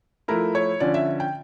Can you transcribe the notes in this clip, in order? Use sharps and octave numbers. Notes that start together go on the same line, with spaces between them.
F3 A3 E4 A#4
C#5
D3 F3 C#4 D5
E5
G5